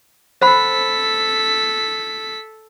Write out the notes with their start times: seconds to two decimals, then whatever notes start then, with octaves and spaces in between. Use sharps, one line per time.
0.42 A4 C5 F#5 B5 B6